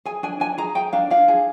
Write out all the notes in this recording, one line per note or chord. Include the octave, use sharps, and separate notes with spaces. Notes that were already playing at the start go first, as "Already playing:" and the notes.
G#4 G#5
D4 G#5
D4 G#5
G#4 A#5
G#4 G5
D4 F5
D4 F5
G#4